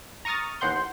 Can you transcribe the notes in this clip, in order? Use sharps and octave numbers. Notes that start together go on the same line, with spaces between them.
A#5 C#6 D#6 F6 A6
A1 D#2 F#5 C6 G6